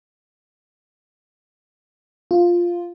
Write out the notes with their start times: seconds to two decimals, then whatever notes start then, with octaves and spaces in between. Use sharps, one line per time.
2.31 F4